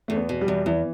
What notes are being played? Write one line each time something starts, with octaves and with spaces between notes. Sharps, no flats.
E2 A3
B3
B2
G3
E2
E2 E3